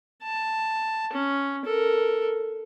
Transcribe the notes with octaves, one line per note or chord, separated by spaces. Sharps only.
A5
C#4
A4 A#4